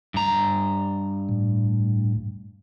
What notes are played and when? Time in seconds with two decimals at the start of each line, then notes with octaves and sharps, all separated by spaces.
0.14 G2 A#5
1.29 A2